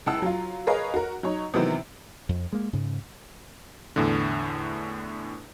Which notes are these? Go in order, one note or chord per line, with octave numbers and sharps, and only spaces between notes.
C#2 E4 F#5 A5 E6
F#3 F4
G#4 A#4 B4 C#5 D#5 F5
F#4 A#4
F#3 D#4 C#5
C3 D#3 E3 F#3 B3 C4
F2
G#3 A#3
G#2 C#3
E2 A2 D3